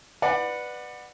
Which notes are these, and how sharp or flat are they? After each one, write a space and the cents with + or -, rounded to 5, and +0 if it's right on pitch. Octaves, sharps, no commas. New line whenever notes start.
B4 +0 D5 +25 F#5 -10